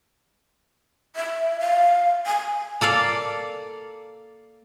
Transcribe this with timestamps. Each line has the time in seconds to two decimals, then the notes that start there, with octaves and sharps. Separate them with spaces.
1.16 E5
1.60 F5
2.26 G#5
2.81 A#3 A4 D5 F5